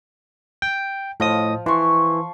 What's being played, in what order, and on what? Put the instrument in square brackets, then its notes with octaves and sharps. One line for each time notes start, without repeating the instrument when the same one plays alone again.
[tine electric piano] G5
[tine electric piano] A2 D#5 D#6 [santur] F3
[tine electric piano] E3 [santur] C6 C#6